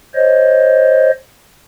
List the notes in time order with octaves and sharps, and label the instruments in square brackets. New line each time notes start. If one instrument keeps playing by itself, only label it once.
[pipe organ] C5 C#5 D#5